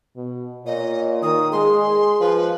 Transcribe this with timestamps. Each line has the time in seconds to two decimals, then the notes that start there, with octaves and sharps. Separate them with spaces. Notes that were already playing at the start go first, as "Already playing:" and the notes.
0.16 B2
0.66 A#2 C#5 D#5
1.23 D#3 D#6
1.53 G#3 G#4 C6
2.21 F3 B4